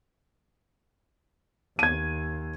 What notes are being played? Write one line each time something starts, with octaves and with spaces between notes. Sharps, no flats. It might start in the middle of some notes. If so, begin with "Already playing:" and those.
D#2 G#6 D#7